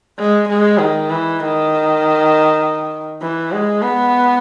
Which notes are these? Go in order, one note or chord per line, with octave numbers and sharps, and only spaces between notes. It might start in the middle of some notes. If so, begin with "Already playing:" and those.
G#3
G#3
D#3
E3
D#3
E3
G#3
B3